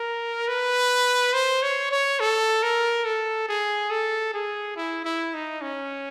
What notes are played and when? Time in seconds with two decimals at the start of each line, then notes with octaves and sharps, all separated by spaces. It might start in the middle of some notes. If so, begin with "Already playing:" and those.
Already playing: A#4
0.48 B4
1.34 C5
1.63 C#5
1.91 C#5
2.20 A4
2.63 A#4
3.05 A4
3.49 G#4
3.91 A4
4.34 G#4
4.76 E4
5.05 E4
5.34 D#4
5.62 C#4